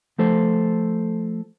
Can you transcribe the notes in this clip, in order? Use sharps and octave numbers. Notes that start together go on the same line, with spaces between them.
F3 A3 A4 C5